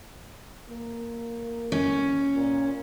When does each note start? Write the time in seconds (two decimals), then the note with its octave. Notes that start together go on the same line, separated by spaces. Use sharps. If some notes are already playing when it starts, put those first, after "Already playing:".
0.71 A#3
1.72 C#4
2.36 A#2